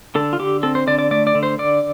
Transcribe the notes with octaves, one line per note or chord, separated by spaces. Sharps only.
D3 A4
F4
D3 G4
C4 A4
C5
D3 D5
D5
A3 D5
D5
D3
C5
D3 D5